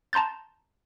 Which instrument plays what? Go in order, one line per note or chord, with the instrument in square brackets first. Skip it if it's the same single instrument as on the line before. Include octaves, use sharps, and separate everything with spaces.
[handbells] A5 A#5 C6 G6 A6